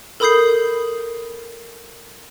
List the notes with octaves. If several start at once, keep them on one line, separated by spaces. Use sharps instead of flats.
A4 A#4 B5 D#6 G6 C7